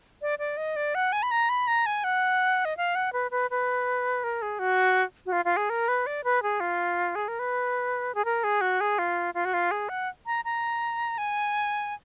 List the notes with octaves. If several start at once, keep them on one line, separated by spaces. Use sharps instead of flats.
D5
D5
D#5
D5
F#5
G#5
B5
A#5
B5
A#5
G#5
F#5
D#5
F5
F#5
B4
B4
B4
A#4
G#4
F#4
F#4
F4
F4
G#4
A#4
B4
D5
B4
G#4
F4
G#4
A#4
B4
G#4
A#4
G#4
F#4
G#4
F4
F4
F#4
F4
G#4
F#5
A#5
A#5
G#5